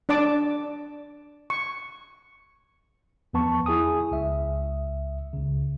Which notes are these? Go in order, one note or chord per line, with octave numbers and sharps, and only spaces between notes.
D4 D5 A5 D6
C#6
E2 F3 B3 A5 C#6
E4 G#4 G#5 D#6
C#2 E5
C#2 C#3